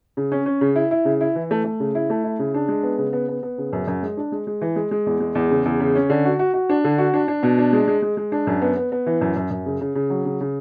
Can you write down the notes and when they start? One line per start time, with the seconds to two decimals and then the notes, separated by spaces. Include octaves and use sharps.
0.17 C#3
0.32 C#4
0.46 C#4
0.61 C#3
0.76 E4
0.91 E4
1.05 C#3
1.21 E4
1.35 E3
1.51 A3
1.64 A3
1.80 C#3
1.95 E4
2.10 A3
2.24 E4
2.39 C#3
2.54 D4
2.68 G#3
2.83 B3
2.98 C#3
3.13 B3
3.28 B3
3.43 B3
3.58 C#3
3.73 F#2
3.87 F#2
4.03 G#3
4.17 D4
4.32 G#3
4.47 G#3
4.61 E3
4.76 G#3
4.91 G#3
5.06 E2
5.20 G#3
5.35 E2
5.51 C#3
5.65 E2
5.80 C#3
5.95 C#4
6.10 D3
6.25 F#4
6.39 F#4
6.54 F#4
6.69 D4
6.84 D3
6.98 F#4
7.14 D4
7.28 D4
7.43 B2
7.58 D4
7.73 G#3
7.88 G#3
8.02 G#3
8.17 G#3
8.32 D4
8.47 F#2
8.62 B3
8.77 B3
8.92 B3
9.06 E3
9.21 F#2
9.36 F#2
9.51 F#2
9.66 C#3
9.81 C#3
9.95 C#3
10.10 F#3
10.25 C#3
10.41 C#3